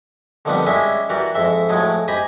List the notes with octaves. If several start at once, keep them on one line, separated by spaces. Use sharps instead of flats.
D3 D#3 F3 G3 B3 C4
G3 G#3 C#4 E4 D#5 E5
E3 F#4 G4 A#4 D5
F2 G#2 E5 C6
A2 F3 F#3 G#3 G#4
G4 C5 D#5 G#5 B5 D#6